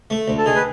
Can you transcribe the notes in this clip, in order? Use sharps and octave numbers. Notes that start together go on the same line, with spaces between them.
A3
D2
A4
D#3 G#4
B4